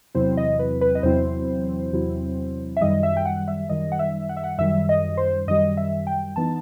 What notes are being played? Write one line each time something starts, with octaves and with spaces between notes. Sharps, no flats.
E2 C3 F#3 C4 E4 C5
D#5
B4
B4
D#5
E2 C3 F#3 C4 E4 C5
E2 C3 F#3 C4 E4
E5
F#2 D#3 G3 D#5
E5
G5
F#5
E5
F#2 D#3 G3 D#5
F#5
E5
F#5
E5
F#5
F#2 D#3 G3 E5
D#5
C5
F#2 D#3 G3 D#5
E5
G5
E3 B3 D#4 A5